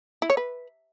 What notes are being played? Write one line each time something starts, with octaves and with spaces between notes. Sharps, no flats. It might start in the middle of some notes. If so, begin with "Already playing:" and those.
E4
C#5
B4